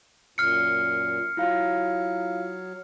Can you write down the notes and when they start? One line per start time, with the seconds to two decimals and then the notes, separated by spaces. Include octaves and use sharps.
0.38 F#2 A#2 F6 C7 C#7
1.37 F#3 E4 F4 F5